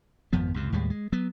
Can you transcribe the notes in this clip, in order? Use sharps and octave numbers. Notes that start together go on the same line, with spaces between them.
G#1 F2 F3 B3
C#2 F#2 C3
D#2 A2 G3 G#3
G#3
F#3 B3